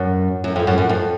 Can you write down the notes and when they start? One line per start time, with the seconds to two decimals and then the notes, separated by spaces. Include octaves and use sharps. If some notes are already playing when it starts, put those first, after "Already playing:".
Already playing: F#2
0.44 F#2
0.56 F2
0.67 F#2
0.78 F#2
0.89 F2